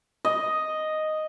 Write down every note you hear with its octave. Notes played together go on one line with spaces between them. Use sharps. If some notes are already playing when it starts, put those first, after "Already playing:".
D#5